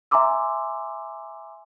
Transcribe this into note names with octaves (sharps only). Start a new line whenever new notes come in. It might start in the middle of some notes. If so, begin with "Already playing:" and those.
E5 G#5 A#5 C6 D6 E6